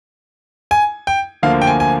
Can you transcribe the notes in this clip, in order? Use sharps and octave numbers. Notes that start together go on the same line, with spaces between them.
G#5
G5
D2 D3 F3 A#3 F5
G5
G#5
G#5